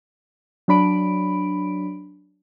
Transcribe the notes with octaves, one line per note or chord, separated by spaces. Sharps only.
F#3 D4 B5 D7